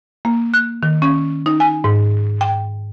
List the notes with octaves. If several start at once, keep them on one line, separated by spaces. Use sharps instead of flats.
A#3
F#6
D#3
C#4
D#4
G#5
G#2
G5